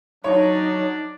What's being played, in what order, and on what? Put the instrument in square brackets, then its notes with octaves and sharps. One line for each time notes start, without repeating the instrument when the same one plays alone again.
[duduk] F#3 [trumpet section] D4 D5 [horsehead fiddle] D#4 [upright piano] C#5